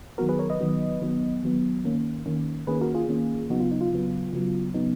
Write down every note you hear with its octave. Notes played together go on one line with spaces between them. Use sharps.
D#3 F#3 B3 F#4 A#4
G#4 B4
A#4 C#5
B4 D#5
D#3 F#3 B3
D#3 F#3 B3
D#3 F#3 B3
D#3 A#3 C#4
D#3 A#3 C#4
D#3 A#3 C#4 G#4 B4
F#4 A#4
F4 G#4
D#3 A#3 C#4
C#3 F#3 B3 D#4 F#4
F4
D#4
F4
C#3 F#3 B3
C#3 F#3 B3
C#3 F#3 B3 D#4